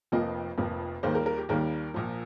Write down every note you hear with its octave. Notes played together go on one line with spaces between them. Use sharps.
F1 F2 F3 A#3 D#5
F1 F2 F3 A#3
D#2 D#3 G3 A#3 C5
A#4
A#4
G4
D#2 D#3 G3 A#3 A#4
A#1 A#2 F3